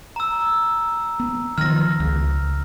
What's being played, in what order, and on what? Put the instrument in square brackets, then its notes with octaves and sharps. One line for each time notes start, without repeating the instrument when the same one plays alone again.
[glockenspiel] A#5 E6
[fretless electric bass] B3
[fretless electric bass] D#3 F3 [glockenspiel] F6 A#6
[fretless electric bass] C#2